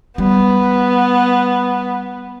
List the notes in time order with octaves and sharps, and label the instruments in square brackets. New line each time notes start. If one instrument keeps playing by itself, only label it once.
[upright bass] G3 [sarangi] B3